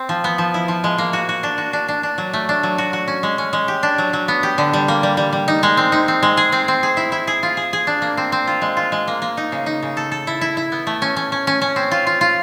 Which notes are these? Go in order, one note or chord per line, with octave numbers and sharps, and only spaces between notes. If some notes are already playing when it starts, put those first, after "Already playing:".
Already playing: C4
F3
B3
F3
E4
F3
G#3
A#3
F#4
F#4
D4
F#4
D4
D4
D4
F#3
A3
D4
F#3
F#4
F#4
C#4
G#3
C#4
G#3
G4
D4
F#3
F#3
B3
G4
D3
G3
A#3
G3
G3
G3
D#4
G#3
C4
D#4
C4
G#3
G#4
C4
C4
G#4
E4
E4
G#4
F4
G#4
G#4
D4
A#3
C4
C4
F4
G#3
F4
G#3
A#3
A#3
D#4
C#3
D#4
C#3
A4
A4
E4
E4
E4
B3
A3
C#4
C#4
C#4
C#4
C#4
C4
F4
F4
F4